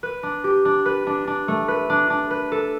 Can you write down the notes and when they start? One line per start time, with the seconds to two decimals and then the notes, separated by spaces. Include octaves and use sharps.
0.03 B4
0.23 D4
0.44 G4
0.65 D4
0.86 B4
1.07 D4
1.27 D4
1.48 A3
1.68 B4
1.90 D4
2.10 D4
2.31 B4
2.52 A4